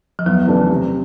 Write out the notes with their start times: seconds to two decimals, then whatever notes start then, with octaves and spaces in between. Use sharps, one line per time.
0.19 F3
0.26 E2 F#3
0.47 C#3 E3 A3 D4
0.70 C3